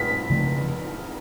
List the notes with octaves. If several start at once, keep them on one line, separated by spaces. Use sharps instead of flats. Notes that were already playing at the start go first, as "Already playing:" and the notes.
Already playing: B6
C#3 F3 A3